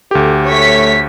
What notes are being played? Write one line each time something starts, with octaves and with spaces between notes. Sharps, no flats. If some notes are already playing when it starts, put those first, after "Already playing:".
D2 G4 A4
A3 C#5 B6